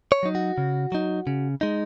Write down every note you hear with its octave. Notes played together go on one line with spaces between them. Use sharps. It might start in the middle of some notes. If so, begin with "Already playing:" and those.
C#5
F#3 D#4
F#4
C#3
F#3 D#4
C#3
G#3 D#4